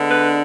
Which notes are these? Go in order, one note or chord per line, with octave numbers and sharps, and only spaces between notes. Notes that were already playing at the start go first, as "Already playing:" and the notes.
Already playing: D3 G#3 B3 D4
B4